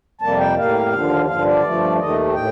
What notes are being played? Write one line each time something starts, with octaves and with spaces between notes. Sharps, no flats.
F2 C3 G3 A#3 A5
G5
A2 G3 A#3 F5
D#2 D3 F3
G2 D3 F3 F5
D5
G2 F3 A3
D#2 D#3 A3 D#5
A2 G5